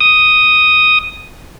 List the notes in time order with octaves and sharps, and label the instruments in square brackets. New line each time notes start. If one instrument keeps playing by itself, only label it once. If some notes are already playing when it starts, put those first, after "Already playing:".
[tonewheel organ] D#6